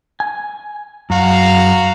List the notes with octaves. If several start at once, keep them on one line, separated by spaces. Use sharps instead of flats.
G#5
F#2 F#4 F5 A#5